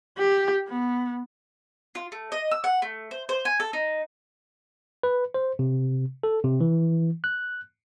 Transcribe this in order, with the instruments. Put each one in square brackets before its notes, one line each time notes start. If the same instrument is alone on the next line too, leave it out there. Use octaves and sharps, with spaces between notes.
[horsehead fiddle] G4
B3
[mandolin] F4
A3
D#5
E6
F#5
A3
C5
C5
G#5
A4
D#4
[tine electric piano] B4
C5
C3
A4
C3
E3
F#6